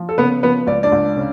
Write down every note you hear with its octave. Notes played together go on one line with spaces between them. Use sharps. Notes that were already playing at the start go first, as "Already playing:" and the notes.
Already playing: F3
A4
C#3 B3 B4
F3 B3 B4
C#2 D5
D4 D5
C#2
C#3